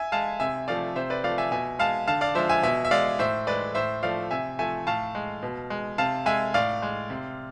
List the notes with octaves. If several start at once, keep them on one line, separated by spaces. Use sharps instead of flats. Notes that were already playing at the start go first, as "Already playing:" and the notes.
Already playing: E5 G#5
G#3 F5 A5
C3 E5 G#5
F3 A3 D5 F5
C3 C5 E5
B4 D5
F3 A3 D5 F5
E5 G#5
B2 E5 G#5
G#3 F5 A5
D3 F5 A5
D5 F5
F3 G#3 C5 E5
E5 G#5
B2 E5 G#5
E5
G#3 D5 F5
A2 C5 E5
G#3 B4 D5
A2 C5 E5
F3 A3 D5 F5
C3 E5 G#5
F3 A3 E5 G#5
A2 F5 A5
G#3
B2
G#3
C3 F5 A5
G#3 E5 G#5
A2 D5 F5
G#3
C3